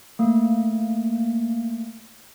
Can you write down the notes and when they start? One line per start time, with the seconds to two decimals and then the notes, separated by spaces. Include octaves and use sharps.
0.19 A3 A#3